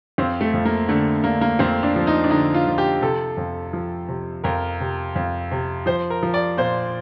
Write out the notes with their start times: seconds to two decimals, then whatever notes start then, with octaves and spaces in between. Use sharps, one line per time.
0.18 F2 C4
0.41 A3
0.54 F2
0.65 A#3
0.89 D3 A3
1.24 D3 A#3
1.41 A#3
1.59 F2 C4
1.83 D4
1.96 F3
2.07 D#4
2.24 D4
2.30 D3 D#4
2.54 F4
2.67 F3
2.78 G4
3.02 C3 A4
3.37 F2
3.73 F3
4.09 C3
4.44 F2 A#4
4.80 C3
5.16 F2
5.51 C3
5.86 F3 C5
6.10 A#4
6.23 F3
6.34 D5
6.57 A#2 C5